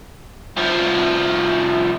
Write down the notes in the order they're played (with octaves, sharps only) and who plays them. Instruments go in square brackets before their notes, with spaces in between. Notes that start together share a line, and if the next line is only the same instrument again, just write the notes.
[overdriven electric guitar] C2 F3